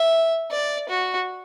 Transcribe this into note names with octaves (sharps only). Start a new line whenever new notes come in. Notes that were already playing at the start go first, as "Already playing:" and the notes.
Already playing: E5
D5
F#4